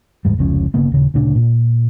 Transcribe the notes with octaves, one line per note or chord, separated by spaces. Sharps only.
F#1 E2 G#2 G3
F1 C#2 F3 C#4
G1 C#3 A#3 B3
D#1 C#3
D2 A#2 C#3 D4
A#2